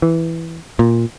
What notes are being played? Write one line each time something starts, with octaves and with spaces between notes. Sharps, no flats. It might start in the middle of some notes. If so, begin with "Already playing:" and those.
E3
A#2